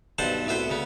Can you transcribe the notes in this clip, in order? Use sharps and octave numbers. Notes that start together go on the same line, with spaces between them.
B1 G2 C5 F#5 A5
C2 A2 B3 F#4 C5
D2 C#3 B3